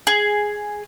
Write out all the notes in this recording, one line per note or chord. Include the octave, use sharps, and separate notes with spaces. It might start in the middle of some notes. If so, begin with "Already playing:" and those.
G#4